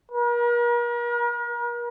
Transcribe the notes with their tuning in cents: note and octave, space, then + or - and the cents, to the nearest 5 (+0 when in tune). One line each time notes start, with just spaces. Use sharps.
A#4 +40